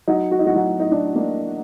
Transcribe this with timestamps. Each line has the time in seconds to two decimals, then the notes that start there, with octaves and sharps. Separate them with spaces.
0.08 F#3 D#4
0.31 F#4
0.39 D#4
0.44 A2 F#3 F#4
0.55 F#3 F#4
0.80 A2 D#4
0.92 D4
1.15 A#3 D4